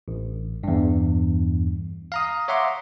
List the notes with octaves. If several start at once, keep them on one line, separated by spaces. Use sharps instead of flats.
A1
E2 G2
F5 A#5 D#6
C#5 E5 F#5 A#5 C6 D6